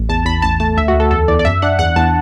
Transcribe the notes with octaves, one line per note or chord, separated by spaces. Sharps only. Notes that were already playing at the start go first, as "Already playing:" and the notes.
Already playing: A1
E2 A5
E2 B5
A1 A5
A3 A5
D2 E5
F#4
D2
A4
E2 A4
E2 D5
D5
F#2 E5
D4 F#5
E2 F#5
E2 A5